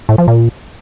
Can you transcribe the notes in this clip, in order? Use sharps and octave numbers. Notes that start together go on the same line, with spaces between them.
A2
F3
A#2